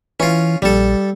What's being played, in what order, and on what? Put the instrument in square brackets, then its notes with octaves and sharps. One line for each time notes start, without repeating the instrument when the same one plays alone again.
[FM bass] E3 [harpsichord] C#4 F4
[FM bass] A#1 [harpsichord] G3 A4